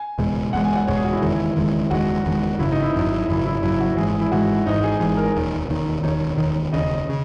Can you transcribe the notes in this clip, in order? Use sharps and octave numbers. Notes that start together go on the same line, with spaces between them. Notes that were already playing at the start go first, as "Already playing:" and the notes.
Already playing: G#5
F#1 E2 B2 G#3
F#1 E2 B2 G#3 F#5
G#5
F#5
F#1 E2 B2 G#3 C#5
G#4
F#4
E4
F#1 E2 D#3 G#3
F#1 E2 D#3 G#3
F#1 E2 D#3 G#3 F#4
F#1 E2 D#3 G#3
G#1 F#2 C#3 F#3 E4
D#4
E4
G#1 F#2 C#3 F#3
G#1 F#2 C#3 F#3 E4
E4
G#1 F#2 C#3 F#3 E4
F#4
G#1 G#2 E3 G#3 G#4
E4
G#1 G#2 E3 G#3 F#4
G#1 G#2 E3 G#3 D#4
G#4
G#1 G#2 E3 G#3 G#4
A#4
E1 D#2 D#3
E1 D#2 D#3
E1 D#2 D#3 C#5
E1 D#2 D#3
E1 D#2 C#3 D#5
C#3